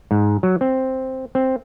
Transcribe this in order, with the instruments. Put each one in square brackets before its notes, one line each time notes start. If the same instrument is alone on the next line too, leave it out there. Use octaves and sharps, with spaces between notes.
[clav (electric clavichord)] G#2
F#3
C4
C4